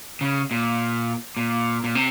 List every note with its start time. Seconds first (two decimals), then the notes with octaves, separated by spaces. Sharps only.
0.21 C#3
0.51 A#2
1.37 A#2
1.84 A#2
1.95 C3